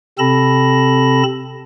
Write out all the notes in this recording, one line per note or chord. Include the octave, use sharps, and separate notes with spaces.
C3 C4 A4 A5 B5 A#6